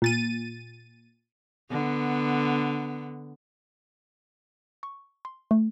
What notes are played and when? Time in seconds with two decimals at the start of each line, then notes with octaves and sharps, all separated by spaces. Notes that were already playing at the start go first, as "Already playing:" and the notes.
0.02 A#2 A6 D#7
1.70 D3 B3
4.83 C#6
5.25 C6
5.51 A3